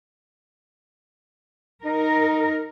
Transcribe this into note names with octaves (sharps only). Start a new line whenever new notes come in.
D#4 A#4